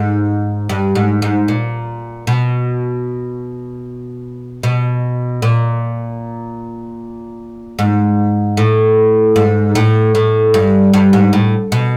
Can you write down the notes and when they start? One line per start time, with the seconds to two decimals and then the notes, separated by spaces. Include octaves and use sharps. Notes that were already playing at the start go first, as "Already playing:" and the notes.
Already playing: G#2
0.69 G2
0.95 G#2
1.22 G#2
1.48 A#2
2.27 B2
4.63 B2
5.42 A#2
7.79 G#2
8.57 A2
9.36 G#2
9.75 A2
10.15 A2
10.54 G2
10.94 G2
11.13 G#2
11.33 A2
11.72 B2